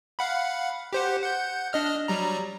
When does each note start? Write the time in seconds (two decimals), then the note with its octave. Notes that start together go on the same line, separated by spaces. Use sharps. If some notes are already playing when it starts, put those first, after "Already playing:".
0.19 F5 F#5 B5
0.93 G4 C5 F#5
1.22 F#5 G6
1.73 D4 D#5 F6
2.08 F#3 G3 A#5